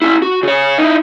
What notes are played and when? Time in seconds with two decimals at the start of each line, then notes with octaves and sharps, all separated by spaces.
0.02 C#4 E4
0.22 F#4
0.43 C#3 C#5
0.78 D#4 E4